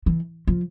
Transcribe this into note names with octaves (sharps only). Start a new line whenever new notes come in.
E3
F3